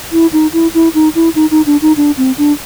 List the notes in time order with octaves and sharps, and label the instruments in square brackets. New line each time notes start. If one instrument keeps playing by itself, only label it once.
[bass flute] E4
D#4
E4
E4
D#4
E4
D#4
D#4
D4
D#4
D4
C4
D4